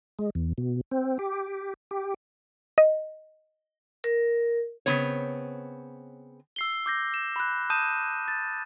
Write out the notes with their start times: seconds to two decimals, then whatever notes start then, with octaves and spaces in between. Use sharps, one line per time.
0.19 G#3
0.35 E2
0.58 B2
0.91 C4
1.19 G4
1.91 G4
2.78 D#5
4.04 A#4
4.86 C#3 B3 C4 C#5
6.56 E6 C7 G7
6.86 D6 G6 A#6
7.14 E7
7.36 B5 F#6
7.70 A5 D#6 G6 D#7 E7
8.28 A6